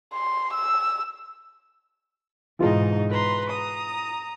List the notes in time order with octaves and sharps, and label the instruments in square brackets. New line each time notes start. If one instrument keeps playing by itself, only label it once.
[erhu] C6
E6
[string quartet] G#2 B2 D#4 [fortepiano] E3 F4 G#4
[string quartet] B4 A#5 C6
A#5 D#6